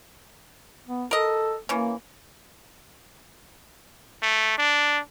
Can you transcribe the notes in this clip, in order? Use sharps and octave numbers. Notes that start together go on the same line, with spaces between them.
B3
A4 A#4 D#5
E3 A#3 C#4
A3
D4